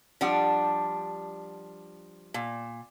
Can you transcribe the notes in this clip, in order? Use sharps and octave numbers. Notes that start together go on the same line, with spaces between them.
F3 G3 D4 F#5
A#2